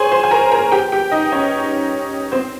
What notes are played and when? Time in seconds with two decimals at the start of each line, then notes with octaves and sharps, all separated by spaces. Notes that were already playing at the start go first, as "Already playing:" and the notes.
Already playing: G#4 C5 C#5 G#5 C6
0.12 C5 C6
0.24 G#5
0.31 A#4 A#5
0.52 A#4 A#5
0.72 G4 G5
0.92 G4 G5
1.12 D#4 D#5
1.32 C#4 C#5
2.32 C4 C5